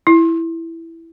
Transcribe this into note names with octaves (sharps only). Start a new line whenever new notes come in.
E4